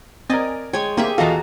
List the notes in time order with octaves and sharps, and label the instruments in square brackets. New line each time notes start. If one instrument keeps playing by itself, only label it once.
[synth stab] C4 D#5 G#5 [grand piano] A#4 D5 A6
[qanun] G#3 C#5 [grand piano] G5 [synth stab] G#6
[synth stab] A#3 C4 [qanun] G4 G#4 E5
[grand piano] E2 F4 F5 [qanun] F#4 A#5 [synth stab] A4 D#5 A5